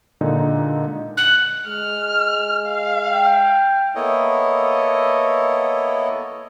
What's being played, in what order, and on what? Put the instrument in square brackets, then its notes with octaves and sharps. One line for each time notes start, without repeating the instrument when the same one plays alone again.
[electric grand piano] A#2 D3 G#3 D#4
[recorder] F#6
[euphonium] G#3 [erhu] F6
[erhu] F5
[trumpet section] G5
[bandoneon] A#3 B3 E4 A4 C#5 D#5